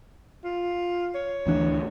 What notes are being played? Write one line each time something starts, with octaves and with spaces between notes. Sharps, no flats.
F4
C#5
D2 E3 D4